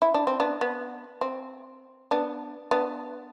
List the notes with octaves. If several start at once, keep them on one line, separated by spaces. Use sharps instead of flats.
E4
D4
C4
B3 D4
B3
C4
B3 D4
B3 D4